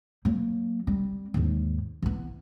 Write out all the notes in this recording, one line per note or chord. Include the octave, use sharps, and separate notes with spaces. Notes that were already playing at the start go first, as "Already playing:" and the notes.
F#3 A#3
G3 C4
D#2 G#2
E3 B3